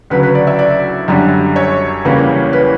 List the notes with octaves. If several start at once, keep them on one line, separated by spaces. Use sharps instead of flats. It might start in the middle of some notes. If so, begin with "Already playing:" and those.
D2 C#3 F#3 B4
B4
D5
E5
D5
F#2 D3 G3
C#5
E2 C#3 E3 G3 A#3
B4